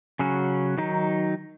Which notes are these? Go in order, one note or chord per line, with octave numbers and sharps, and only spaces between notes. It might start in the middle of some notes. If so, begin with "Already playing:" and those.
C#3 F#3 C#4 F#4
D#3 F#3 D#4